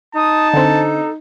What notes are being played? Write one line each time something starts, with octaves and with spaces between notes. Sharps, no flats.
D#4 A5 D#6
D3 C4 A4